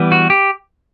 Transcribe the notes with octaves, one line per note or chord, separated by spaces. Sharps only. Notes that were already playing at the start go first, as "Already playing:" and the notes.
Already playing: E3 G3 B3
F#4
G4